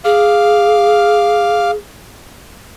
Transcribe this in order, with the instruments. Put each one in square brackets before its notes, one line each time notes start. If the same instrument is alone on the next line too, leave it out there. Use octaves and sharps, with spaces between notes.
[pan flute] G#4 [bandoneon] F5 D6 F6